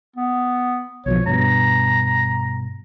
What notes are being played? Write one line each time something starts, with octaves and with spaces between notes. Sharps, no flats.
B3
B1 B2 F3 C#5
G2 B2 A#5